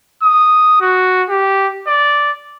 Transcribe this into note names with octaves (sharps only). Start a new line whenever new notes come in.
D#6
F#4
G4
D5